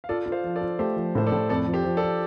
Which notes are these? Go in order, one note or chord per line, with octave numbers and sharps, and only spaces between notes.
F5
F4 A4 D5
F4
C5 F5
F3
A4 D5
F4
A3 G4 C5
F3
A2 C5
A4 D5
A2
F2 A4 D5
F3
G4 C5
F3
A4 D5
F4